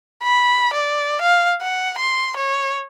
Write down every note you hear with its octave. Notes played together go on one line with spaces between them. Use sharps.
B5
D5
F5
F#5
C6
C#5